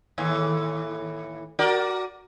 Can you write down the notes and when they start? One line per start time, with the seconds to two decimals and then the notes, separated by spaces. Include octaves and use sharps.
0.18 D#2 A2 E3
1.59 F#4 A#4 D5